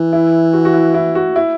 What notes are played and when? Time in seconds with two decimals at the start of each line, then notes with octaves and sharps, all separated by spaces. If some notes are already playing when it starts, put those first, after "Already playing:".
Already playing: E3
0.13 E4
0.53 F#4
0.65 F#4
0.74 E4
0.94 E4
1.15 F#4
1.36 E4